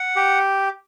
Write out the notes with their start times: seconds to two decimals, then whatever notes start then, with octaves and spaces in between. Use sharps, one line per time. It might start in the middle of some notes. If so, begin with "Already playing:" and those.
Already playing: F#5
0.16 G4